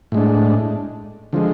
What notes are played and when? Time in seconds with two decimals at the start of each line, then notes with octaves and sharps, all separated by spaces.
0.12 A2 G#3 D4
1.33 D3 F3 G#3